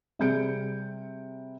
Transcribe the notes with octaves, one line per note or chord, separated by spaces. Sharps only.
C3 G3 G#4 G6 C#7 D7